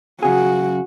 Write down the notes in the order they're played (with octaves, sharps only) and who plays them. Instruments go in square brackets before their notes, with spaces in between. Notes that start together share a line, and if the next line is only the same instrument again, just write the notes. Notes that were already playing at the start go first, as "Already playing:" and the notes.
[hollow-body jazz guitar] F#2 C#3 G#4 [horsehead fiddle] F#4